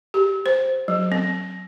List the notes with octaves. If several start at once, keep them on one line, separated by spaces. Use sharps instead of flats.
G4
C5
F#3
C4